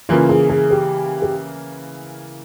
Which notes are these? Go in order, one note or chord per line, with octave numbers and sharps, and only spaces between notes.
C#3 E3 A#3 F4
G#4
G#4
G4
G4